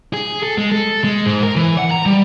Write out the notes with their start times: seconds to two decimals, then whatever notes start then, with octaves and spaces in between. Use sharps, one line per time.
0.13 G#4
0.43 A4
0.58 G#3
0.71 A4
1.04 G#3
1.26 G#2
1.43 A#4
1.56 E3
1.78 F#5
1.91 A#5
2.06 G3